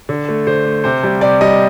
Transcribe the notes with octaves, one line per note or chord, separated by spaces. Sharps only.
D3
A3
D3 C5
A3
C3 C5
G3
C3 D5
G3 D#5